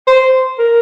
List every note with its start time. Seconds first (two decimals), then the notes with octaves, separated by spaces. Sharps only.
0.07 C5
0.59 A#4